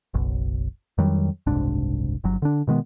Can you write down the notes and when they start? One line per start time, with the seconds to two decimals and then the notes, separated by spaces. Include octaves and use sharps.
0.14 F#1 B1
0.98 F2 D#3 F#3 G3
1.46 F#1 C2 G#2 D4
2.24 G1 F#3
2.42 D3 D4
2.67 B2 D#3 G#3 B3